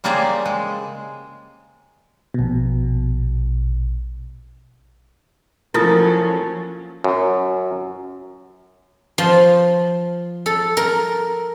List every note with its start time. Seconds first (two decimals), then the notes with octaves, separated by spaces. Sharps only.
0.04 C#3 G3 A#3 G#4 C5 D5
0.46 G#3
2.34 A#1 B2
5.74 F3 F#3 A#3 C#4 E4 F4 A4 D#6
7.04 F#2
9.18 F3
10.46 A4
10.77 A#4